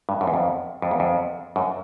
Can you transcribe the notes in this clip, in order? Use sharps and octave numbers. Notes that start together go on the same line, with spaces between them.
G2
F#2
E2
F2
F2
E2
F2
F#2